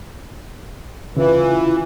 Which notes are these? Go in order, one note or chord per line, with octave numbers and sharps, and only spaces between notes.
C#3 E3 E4 F4